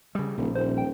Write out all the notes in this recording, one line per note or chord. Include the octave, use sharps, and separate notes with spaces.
C#3 G3
D#1 A#1
D#1 C5
G5